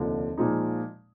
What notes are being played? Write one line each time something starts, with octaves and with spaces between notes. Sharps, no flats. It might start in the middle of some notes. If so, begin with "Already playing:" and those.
Already playing: F1 D#2 D3 F3
A#2 F3 G#3 D#4